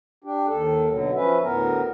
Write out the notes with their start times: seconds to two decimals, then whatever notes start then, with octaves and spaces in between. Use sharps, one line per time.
0.24 D4 G4
0.47 D#2 A4
0.89 B2 D3 F#3
1.15 F3 C#4 B4 E5
1.42 D2 A2 B3 A#4